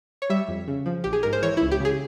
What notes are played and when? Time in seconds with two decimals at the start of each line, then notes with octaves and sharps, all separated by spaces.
0.22 C#5
0.30 G3 E5
0.48 F2
0.68 C#3
0.86 F3
1.04 A#1 G4
1.13 G#4
1.23 G#2 A#4
1.33 C5
1.42 E3 C#5
1.57 E4
1.61 C#2
1.71 G4
1.80 C#3 G#4